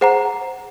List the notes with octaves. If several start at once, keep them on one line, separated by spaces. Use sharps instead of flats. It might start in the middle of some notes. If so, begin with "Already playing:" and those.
G#4 C5 F#5 A#5